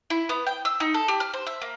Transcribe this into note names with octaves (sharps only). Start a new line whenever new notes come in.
E4
B3
G5
E6
D#4
A4
G4
F6
C5
E5
A#3